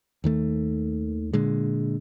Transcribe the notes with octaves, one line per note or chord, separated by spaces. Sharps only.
D#2 D#3 A3
A#2 D3 G#3